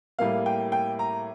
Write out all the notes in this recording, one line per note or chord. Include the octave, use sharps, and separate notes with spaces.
A2 G3 A#3 F5
G5
G5
A#5